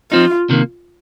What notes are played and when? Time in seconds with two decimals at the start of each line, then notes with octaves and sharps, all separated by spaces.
0.11 F3 C4 D#4 F4
0.50 C3 D#3 A#3